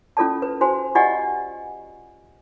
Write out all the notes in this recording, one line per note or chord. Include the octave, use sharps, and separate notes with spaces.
C#4 F4 A4 D5 A5
B4
F#4 C5 G#5 C6
F4 G4 D5 D#5 F#5 G#5